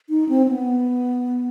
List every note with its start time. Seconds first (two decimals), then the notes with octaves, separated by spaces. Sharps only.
0.09 D#4
0.29 C4
0.48 B3